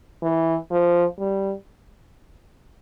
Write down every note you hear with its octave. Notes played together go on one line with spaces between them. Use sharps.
E3
F3
G3